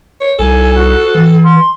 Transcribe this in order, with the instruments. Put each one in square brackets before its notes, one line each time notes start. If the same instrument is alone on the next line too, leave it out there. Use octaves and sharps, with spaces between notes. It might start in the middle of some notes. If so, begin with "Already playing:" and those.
[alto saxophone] C#5
[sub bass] C2 [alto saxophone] A4 [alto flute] G#5
[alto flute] F#4
[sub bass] E3
[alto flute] C6